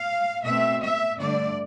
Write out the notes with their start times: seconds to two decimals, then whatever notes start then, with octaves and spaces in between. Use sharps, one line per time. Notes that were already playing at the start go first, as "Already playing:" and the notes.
Already playing: F5
0.44 B2 A3 C4 E5
0.80 E5
1.18 G2 D3 A3 D5